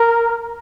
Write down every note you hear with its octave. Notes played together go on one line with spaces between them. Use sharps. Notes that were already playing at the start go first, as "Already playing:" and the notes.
Already playing: A#4